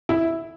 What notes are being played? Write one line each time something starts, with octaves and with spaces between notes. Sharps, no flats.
E4